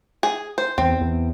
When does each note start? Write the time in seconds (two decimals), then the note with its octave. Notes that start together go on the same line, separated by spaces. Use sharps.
0.23 G#4
0.58 C5
0.78 E2 C4
1.01 E2